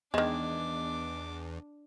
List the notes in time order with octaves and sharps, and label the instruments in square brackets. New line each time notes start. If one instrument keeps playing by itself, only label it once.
[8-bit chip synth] E2 [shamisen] D#3 G#3 [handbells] B3 D#5 [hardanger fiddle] D4 D6